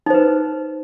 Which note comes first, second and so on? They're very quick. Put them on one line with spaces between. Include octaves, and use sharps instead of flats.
D#4 C5 B4